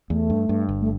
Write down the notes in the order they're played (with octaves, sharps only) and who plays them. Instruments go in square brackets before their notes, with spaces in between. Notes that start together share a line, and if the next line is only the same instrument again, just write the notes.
[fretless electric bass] E2 [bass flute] A3
[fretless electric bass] G2
G2
G1
[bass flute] A3